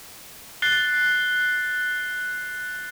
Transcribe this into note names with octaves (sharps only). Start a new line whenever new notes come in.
F#6 A6 C7 G7